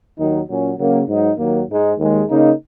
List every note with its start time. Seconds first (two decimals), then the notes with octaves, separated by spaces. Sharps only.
0.18 D#2 D#3 F#3 D#4
0.48 A#2 F#3 C#4
0.78 C#3 F#3 A#3 C#4
1.07 G#2 F#3 D#4
1.38 D#2 D#3 F#3 A#3
1.68 G#2 G#3 D#4
1.98 D#2 D#3 G#3
2.28 C#3 A#3 D#4